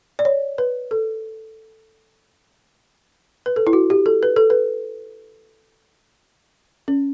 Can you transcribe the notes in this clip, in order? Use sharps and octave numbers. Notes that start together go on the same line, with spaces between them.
D5
C#5
B4
A4
B4
A4
E4
F#4
G4
A4
B4
A4
B4
C#4